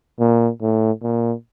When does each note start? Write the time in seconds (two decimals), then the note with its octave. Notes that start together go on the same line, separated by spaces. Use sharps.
0.19 A#2
0.61 A2
1.03 A#2